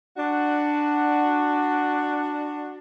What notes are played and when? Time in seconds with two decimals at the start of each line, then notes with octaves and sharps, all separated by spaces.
0.16 D4 F#4